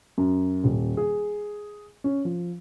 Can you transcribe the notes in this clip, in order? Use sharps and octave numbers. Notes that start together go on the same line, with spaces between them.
F#2
D#1
G#4
C#4
F3